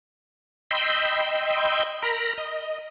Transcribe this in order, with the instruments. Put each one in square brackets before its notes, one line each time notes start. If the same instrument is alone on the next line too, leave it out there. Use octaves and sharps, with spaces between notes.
[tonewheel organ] D#5 G5 B5 C6 E6
A#4 A#5 B5
D#5